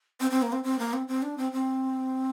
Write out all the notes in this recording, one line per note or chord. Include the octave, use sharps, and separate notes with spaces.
C4
C4
A#3
C4
C4
A#3
C4
C4
D4
C4
C4